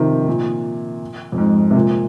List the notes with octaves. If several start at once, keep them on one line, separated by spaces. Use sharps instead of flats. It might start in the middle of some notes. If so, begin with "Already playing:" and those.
Already playing: C3 D#3 F3
A#2
F2
G#2
C3
A#2